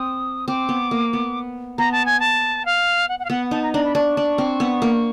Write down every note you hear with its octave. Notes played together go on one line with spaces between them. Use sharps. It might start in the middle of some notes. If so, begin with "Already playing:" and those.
Already playing: C4 D#6
C4 D6
B3
A#3
B3
B3 A#5
A5
G#5
A5
F5
F#5
F#5
F5
B3 F#5
D#4 A5
A#5
D4 A#5
B5
D4 C#6
D4
C4
B3
A#3